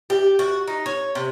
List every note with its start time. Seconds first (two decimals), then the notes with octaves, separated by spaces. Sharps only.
0.10 G4
0.39 F#4
0.68 D#4
0.86 C#5
1.15 C3